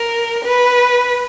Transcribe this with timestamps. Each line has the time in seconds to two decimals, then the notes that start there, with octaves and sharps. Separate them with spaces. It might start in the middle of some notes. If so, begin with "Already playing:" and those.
Already playing: A#4
0.45 B4